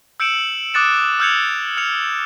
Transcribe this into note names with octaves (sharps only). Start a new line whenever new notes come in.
E6 G6 C#7 D7 E7 F#7
D6 D#6 F#6 A6 C#7 E7
E6 F6 G6 G#6 C#7 F7
F6 C#7 F7